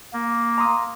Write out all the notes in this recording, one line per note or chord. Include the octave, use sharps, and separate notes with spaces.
A#3
A#5 C6 D#6